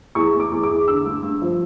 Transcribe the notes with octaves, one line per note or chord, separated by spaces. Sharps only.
E2 C#6
E2
D6
E2
D6
E2
D3 E6
G2
G2
F3